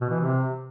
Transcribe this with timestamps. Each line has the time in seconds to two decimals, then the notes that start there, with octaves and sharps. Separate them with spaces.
0.01 B2
0.10 E3
0.20 C3